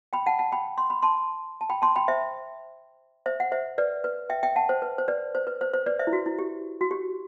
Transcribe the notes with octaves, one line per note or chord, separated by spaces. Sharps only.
G5 B5
F#5 A5
F#5 A5
G5 B5
C6
B5
A5 C6
A5
G5 B5
A5 C6
G5 B5
C5 E5
C5 E5
F#5
C5 E5
B4 D5
B4
E5 G5
E5 G5
F#5 A5
C5
B4
C5
B4 D5
C5
B4
C5
C5
B4 D5
C5 E5
E4
F#4
E4
G4
F#4
G4